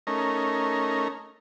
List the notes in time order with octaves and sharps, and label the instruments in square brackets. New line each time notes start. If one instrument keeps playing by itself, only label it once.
[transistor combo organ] A3 C#4 D#4 A#4